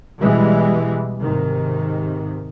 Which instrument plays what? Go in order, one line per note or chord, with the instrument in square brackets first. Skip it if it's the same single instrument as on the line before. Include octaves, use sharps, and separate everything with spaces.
[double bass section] B2 E3 G3 G#3
G#2 C3 D#3